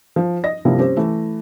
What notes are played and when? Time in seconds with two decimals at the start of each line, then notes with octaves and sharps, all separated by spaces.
0.16 F3
0.44 D#5 A#6
0.65 G2 C3 F3 G3 A#3 E4
0.78 C4 C#4 G4 C5
0.97 E3 A3